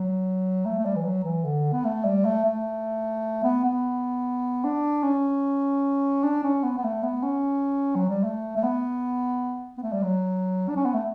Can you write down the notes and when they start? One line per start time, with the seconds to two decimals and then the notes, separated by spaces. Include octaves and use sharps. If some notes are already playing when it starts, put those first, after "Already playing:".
Already playing: F#3
0.66 A3
0.79 A3
0.85 G3
0.96 E3
1.05 F#3
1.24 E3
1.44 D3
1.73 B3
1.85 A3
2.05 G3
2.25 A3
2.45 A3
3.44 B3
3.64 B3
4.64 D4
5.03 C#4
6.24 D4
6.44 C#4
6.64 B3
6.78 B3
6.84 A3
7.03 B3
7.23 C#4
7.96 F#3
8.10 G3
8.24 A3
8.57 A3
8.64 B3
9.78 B3
9.83 A3
9.93 G3
10.03 F#3
10.69 D4
10.77 C#4
10.86 B3
10.94 A3